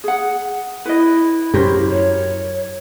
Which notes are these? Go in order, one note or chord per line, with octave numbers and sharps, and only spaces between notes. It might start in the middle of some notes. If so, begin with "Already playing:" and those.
G#4 F#5
E4 B4 D#5
F#2 G4 A#4 C5
C#5